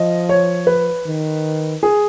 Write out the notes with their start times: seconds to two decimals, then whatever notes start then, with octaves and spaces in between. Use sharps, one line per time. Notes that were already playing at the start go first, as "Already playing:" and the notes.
Already playing: F3 D#5
0.29 C#5
0.67 B4
1.06 D#3
1.83 G#4